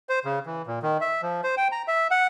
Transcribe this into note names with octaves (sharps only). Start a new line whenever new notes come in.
C5
C#3
E3
A#2
D#3
E5
F3
C5
G5
A#5
E5
F#5